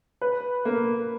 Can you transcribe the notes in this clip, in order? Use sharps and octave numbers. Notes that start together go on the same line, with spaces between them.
B4
A#3